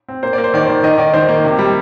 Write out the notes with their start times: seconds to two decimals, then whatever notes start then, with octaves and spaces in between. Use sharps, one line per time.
0.09 C4
0.23 A#3 C5
0.33 D5
0.38 A#3
0.44 C5
0.54 D#3 D5
0.66 D#3 C5
0.83 D#3 D#5
0.98 D#3 D5
1.14 D#3 C5
1.29 A#3
1.44 C3
1.59 G3